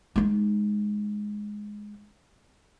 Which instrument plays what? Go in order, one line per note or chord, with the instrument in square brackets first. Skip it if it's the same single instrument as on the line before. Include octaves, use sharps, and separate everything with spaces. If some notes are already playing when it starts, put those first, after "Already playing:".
[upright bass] G#3 D#4